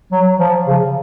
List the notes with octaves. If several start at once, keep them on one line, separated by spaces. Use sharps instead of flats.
F#3
F3
C#3